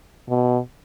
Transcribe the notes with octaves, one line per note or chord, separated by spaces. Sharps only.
B2